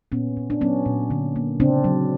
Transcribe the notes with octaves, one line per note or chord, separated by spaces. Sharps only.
A#2 B3 C#4
A#2
D4
F#3 B3 C#4
A#2
D3
A#3
C#3 C4 D4
F#3